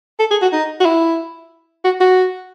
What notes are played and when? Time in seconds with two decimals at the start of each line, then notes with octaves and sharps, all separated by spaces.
0.20 A4
0.31 G#4
0.42 F#4
0.53 D#4
0.80 F#4
0.86 E4
1.84 F#4
2.00 F#4